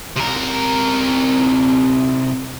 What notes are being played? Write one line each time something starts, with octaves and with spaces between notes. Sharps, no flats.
C3 A#4